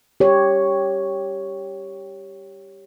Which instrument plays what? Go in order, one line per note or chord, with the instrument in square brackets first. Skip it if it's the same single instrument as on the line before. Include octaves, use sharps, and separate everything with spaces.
[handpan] G4 C#5